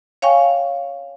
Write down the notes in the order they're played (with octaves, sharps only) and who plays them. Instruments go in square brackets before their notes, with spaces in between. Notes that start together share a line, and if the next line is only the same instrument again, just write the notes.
[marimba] C#5 F5 G5 G#5 C#6